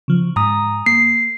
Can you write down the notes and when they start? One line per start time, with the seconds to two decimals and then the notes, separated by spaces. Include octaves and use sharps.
0.08 C#3 F3
0.36 G#2 A#5 D#6
0.86 A#3 C7